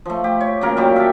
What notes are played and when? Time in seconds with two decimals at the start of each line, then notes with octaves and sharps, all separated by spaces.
0.06 F3 A3
0.24 G4
0.41 C#5
0.61 C#3 F#3 A#3 A#4
0.77 A#2 F#3 G3 G4
0.96 E5 G5 A5